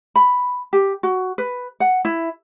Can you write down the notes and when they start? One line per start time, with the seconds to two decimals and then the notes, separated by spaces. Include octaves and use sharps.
0.16 B5
0.73 G4
1.03 F#4
1.38 B4
1.80 F#5
2.05 E4